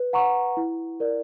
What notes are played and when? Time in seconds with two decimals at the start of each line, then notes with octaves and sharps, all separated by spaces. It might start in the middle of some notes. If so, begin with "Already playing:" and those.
Already playing: B4
0.13 F#5 A#5 C#6
0.57 E4
1.00 A#4 D5